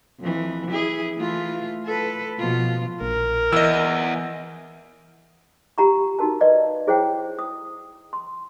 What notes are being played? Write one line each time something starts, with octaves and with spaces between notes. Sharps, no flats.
F2 E3
E4 G#4
E3 A3 F4
A4 B4
B2 F3 F4
A#1 A#4
E2 E3 D#5 E6
F4 G4 F#5 A#5 B5 C#6
D#4 F#4 A#4 A5
B4 D5 D#5 F5
E4 G#4 C5 C#5 F#5 G5
D#6
C6